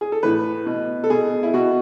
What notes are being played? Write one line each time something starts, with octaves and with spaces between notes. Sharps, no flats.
G#4
A4
A2 E3 B4
B2
A4
B2 G#4
E4
B2 F#4